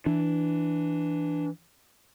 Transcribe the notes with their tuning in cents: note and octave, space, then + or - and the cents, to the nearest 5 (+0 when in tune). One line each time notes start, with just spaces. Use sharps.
E3 +5 D4 +0